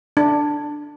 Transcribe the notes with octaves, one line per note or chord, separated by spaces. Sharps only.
D4